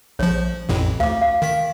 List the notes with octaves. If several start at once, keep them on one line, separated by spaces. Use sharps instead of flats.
A#1 F3 C#5
A1 F2 A2
D2 F5 D6
F5
D#3 B6